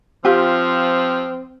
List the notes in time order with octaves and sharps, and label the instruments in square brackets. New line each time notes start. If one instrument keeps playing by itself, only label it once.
[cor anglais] F3 [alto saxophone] C4 [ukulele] F4 G4